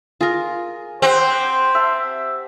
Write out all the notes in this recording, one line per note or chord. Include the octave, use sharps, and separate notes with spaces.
F4 G#4 A#4
C4 G4 C5 F#5
E5 A5